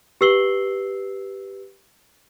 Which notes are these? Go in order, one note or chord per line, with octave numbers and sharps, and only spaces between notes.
G4 B4 E6 C7 F#7 G7